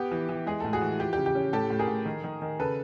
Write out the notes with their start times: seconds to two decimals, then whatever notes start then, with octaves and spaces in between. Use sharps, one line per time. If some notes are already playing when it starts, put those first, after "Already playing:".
Already playing: B3 G4
0.11 E3
0.29 E3
0.46 G#3 G#4
0.60 A2 A4
0.73 F#4 G#4
0.81 E3
1.00 F3 G4
1.13 G4
1.18 C#3
1.26 G4
1.35 C#4
1.53 A2 G4 A4
1.70 A2
1.79 G#4 A#4
1.88 A2
2.05 D#3
2.24 D#3
2.42 D#3
2.59 C#3 A4 B4